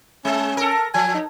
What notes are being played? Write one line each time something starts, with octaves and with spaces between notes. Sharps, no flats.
G#3 C#4
A4 A#4
F3 G#5
D#4